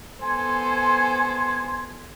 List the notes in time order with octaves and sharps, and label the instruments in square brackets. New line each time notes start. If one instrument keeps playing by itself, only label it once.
[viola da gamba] B3 A4 C5 [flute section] G#5 C6 G#6